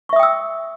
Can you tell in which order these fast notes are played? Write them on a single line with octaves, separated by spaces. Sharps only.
C#6 E5 D#6 G5 E6